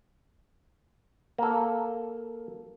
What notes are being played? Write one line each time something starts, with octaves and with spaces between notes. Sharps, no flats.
A#3 A4